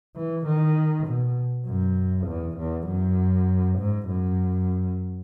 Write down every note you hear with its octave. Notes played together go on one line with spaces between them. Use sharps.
E3
D#3
B2
F#2
E2
E2
F#2
G#2
F#2